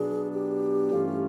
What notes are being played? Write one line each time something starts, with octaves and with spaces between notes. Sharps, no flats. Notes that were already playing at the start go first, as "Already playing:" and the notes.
Already playing: B2 F#3 B3 D4 G#4
G4
G2 E3 A3 C#4 F4